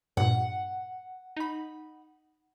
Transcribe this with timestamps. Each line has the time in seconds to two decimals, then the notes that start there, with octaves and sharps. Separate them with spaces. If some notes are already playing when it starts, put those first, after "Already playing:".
0.17 G2 A#2 F#5
1.37 D#4 B5